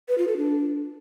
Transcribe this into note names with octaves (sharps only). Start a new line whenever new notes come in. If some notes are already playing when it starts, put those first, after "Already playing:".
B4
F4
A4
D4